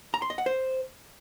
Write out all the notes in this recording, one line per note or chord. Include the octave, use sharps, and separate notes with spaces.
A#5
C6
D#5
F#5
C5